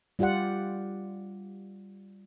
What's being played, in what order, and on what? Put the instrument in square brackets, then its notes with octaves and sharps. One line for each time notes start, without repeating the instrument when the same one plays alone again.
[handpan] G3 F4 G4 D5 F#5